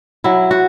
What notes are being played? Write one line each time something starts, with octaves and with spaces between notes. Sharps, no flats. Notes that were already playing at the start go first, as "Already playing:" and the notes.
F#3 E4
F#4